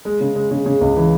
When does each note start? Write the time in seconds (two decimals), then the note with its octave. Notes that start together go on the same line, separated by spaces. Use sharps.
0.05 G#3
0.21 C#3
0.36 G#3
0.51 C#3
0.66 C#3
0.81 C#2
0.97 E3